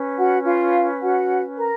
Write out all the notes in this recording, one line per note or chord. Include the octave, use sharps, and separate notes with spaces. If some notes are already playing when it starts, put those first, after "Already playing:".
Already playing: C#4 B4
F#4 F#5
F4 F5
F#4 F#5
A#4 A#5